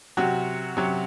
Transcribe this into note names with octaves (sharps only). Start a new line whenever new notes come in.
C3 F#3 F#4
C3 F#3